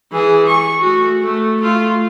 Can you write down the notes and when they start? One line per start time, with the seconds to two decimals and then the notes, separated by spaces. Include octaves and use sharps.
0.12 E3 G#4
0.47 C#6
0.80 A3 F#4
1.23 A3
1.60 A3 F4